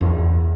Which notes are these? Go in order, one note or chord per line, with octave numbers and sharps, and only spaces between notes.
E2